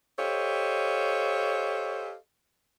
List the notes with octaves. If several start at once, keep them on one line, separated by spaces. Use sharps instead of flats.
G4 A4 C5 C#5 D#5 F5